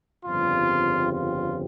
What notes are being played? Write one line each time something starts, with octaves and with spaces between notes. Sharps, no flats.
G1 F2 C#3 G3 C4 F4
F4